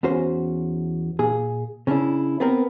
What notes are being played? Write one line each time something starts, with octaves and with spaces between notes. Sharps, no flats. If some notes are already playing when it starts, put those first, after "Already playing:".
E2 C#4 F#4 C5
A#2 G#4
C#3 C#4 D4 E4
B3 C4 A#4